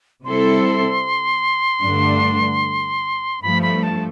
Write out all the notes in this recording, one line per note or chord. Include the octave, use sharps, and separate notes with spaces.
C3 G3 C4 E4 A4 C6
G2 D3 A3 D4
G2 F3 A3 B5
B5
A5